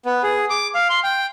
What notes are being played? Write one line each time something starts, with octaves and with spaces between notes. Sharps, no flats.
B3
G#4
D6
F5
C6
G5